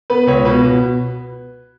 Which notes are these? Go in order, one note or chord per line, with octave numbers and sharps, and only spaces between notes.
B3 B4
C#2 C#5
B2 B4
B2